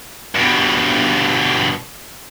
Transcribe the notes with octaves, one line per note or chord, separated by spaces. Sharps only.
G2 B2